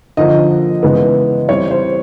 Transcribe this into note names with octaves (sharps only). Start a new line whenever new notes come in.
D3 F3 A#3 D#5
C#3 E3 G#3 B3
E3 G3 C4 C#5
C5